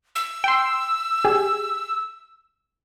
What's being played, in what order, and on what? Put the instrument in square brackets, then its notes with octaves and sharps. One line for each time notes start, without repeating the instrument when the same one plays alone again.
[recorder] E6
[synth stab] G5 C6
G4 G#4